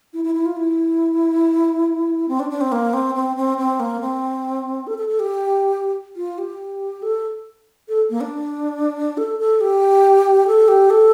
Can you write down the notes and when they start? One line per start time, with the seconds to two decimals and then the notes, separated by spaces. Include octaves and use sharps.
0.13 E4
0.24 E4
0.35 E4
0.46 F4
0.57 E4
2.28 C4
2.40 D4
2.50 D4
2.61 C4
2.72 A#3
2.93 C4
3.15 C4
3.37 C4
3.58 C4
3.80 A#3
4.01 C4
4.87 A4
4.98 A4
5.09 A4
5.20 G4
6.16 F4
6.38 G4
7.02 A4
7.89 A4
8.10 A#3
8.21 D4
9.17 A4
9.39 A4
9.61 G4
10.47 A4
10.68 G4
10.90 A4